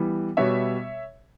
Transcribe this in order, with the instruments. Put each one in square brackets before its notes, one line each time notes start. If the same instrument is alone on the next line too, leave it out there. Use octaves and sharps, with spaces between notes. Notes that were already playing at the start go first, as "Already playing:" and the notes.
Already playing: [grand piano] E3 G3 B3
B2 G3 B3 C#5 E5